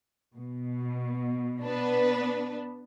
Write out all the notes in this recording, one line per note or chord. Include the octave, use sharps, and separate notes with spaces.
B2
B3 D4 B4